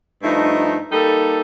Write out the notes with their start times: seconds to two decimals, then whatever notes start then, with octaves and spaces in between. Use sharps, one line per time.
0.23 G2 F3 A3 D#4
0.92 G3 A#3 D#4 A4